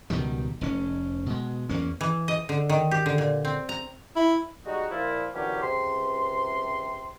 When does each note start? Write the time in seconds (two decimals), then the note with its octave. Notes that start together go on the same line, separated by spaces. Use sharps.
0.10 C#2 B2 D#3 G3
0.61 F1 C#4
1.26 B2 G#3
1.69 E2 A#3 C#4
2.01 E3
2.28 D#5
2.49 D3
2.69 D#3
2.91 G4
3.06 D3
3.18 A#2
3.45 C4
3.69 A#5
4.16 E4
4.66 G3 G#3 D#4 F#4
4.90 A#2 F3 E4 F4
5.34 A#2 D3 E3 F#3 C#4 G4
5.62 C#2 C3 C6